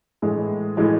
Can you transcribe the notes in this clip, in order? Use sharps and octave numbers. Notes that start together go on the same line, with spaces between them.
A2 E3 G#3
A2 E3 G#3